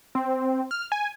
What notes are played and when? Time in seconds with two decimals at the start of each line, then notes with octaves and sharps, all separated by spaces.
0.15 C4
0.71 F6
0.92 G#5